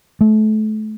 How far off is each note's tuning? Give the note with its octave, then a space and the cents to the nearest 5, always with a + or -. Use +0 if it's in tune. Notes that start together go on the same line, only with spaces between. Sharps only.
A3 -30